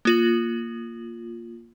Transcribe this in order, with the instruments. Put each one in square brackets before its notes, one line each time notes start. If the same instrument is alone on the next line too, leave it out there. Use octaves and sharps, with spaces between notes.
[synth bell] A#3 F4 F#7